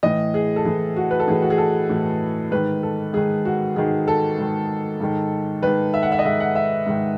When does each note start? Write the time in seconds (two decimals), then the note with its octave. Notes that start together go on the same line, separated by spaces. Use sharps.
0.03 A2 E3 D#5
0.34 G#4
0.56 A4
0.65 A2 E3 G#4
0.96 F#4
1.11 B4
1.20 A4
1.27 A2 E3 G#4
1.42 F#4
1.50 G#4
1.58 A4
1.89 A2 E3
2.51 G#2 D#3 B4
2.83 A4
3.13 G#2 D#3 G#4
3.45 F#4
3.76 G#2 D#3 G#4
4.08 A4
4.38 G#2 D#3
5.00 G#2 D#3
5.62 G#2 D#3 B4
5.94 E5
6.03 F#5
6.12 E5
6.19 D#5
6.25 G#2 D#3 E5
6.40 F#5
6.55 E5
6.86 G#2 D#3